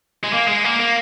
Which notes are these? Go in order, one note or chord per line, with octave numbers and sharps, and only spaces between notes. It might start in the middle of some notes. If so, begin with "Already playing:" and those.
G#3
A#3
G#3
A#3
A#3